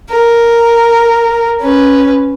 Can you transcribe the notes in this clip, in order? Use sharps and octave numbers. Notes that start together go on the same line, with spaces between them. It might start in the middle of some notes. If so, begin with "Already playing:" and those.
A#4
C#4 B4